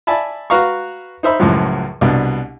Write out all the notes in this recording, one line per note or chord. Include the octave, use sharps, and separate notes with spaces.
D5 E5 G#5 A5 B5
F#4 B4 F5 A#5 C#6
D#4 C5 E5 B5
C#2 F#2 A2 F3 F#3
C2 B2 D4